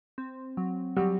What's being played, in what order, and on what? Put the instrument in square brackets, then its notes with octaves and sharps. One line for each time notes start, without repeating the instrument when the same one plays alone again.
[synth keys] C4
F#3
[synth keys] F#3 [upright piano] G3